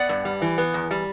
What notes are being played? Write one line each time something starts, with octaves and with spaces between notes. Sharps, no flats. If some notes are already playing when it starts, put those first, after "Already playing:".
Already playing: B3 D5 F#5
G2
G3
E3
B3
E2
G3